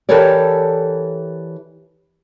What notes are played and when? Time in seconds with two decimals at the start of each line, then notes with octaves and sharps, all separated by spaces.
0.09 E3 G4 A4 A#4 C#5 D5